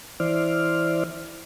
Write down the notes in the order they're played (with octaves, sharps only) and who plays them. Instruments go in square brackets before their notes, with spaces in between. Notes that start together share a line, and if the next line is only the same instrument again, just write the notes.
[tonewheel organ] E3 E4 C5 D5 F6